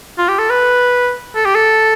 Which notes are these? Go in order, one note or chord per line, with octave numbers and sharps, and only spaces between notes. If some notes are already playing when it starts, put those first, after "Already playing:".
F4
G4
A4
B4
A4
G4
A4